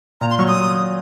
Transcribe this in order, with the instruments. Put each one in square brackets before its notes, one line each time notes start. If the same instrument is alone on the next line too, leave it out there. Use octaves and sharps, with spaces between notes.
[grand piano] A#2 [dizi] A#5
[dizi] C6
[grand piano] F#3 [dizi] C#6
[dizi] D#6